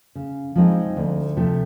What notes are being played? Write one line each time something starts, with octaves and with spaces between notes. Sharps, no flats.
C#3
F3 G#3 C4 D#4
D2
C3 F3 A3